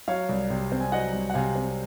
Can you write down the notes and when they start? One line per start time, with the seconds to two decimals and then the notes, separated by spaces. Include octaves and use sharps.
0.08 F#3 C#5 F5
0.29 C2
0.50 C3
0.72 C4
0.80 G#5
0.92 F#3 D#5 F#5
1.13 C2
1.30 F#5
1.34 C3 F5 G#5
1.56 C4